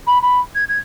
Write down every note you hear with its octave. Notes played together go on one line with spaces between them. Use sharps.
B5
B5
G#6
G#6